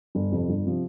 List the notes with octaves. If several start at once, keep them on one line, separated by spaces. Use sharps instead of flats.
G1
F2 C3 F3
G1
C3 F3